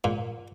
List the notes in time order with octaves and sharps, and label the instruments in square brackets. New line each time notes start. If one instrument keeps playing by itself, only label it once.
[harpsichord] A#2